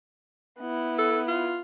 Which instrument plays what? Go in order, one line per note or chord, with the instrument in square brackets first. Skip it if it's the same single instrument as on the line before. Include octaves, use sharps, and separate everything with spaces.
[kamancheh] B3 E4
[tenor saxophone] A4
F4